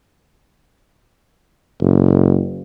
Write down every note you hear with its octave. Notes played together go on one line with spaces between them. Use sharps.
F#1